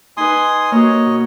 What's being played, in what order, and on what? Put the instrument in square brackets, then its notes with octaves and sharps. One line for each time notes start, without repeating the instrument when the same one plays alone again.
[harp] D#4 B4 [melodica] G#5 C6 D#6
[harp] A#3 F#4 [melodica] C#5 D#5
[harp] B2